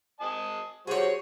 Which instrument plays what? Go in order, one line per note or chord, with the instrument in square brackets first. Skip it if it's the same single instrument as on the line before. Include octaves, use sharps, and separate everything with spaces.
[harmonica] D#5 G#5 A5
[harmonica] G3 F#4 C5 [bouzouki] G#4 C#5